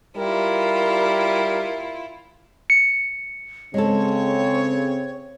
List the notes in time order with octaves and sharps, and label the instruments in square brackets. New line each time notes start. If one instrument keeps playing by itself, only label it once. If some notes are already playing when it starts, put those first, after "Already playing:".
[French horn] G3 [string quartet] E4 F4 [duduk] A#4
[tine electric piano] C#7
[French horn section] C#3 C4 [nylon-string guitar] G#3 A4 [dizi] C#5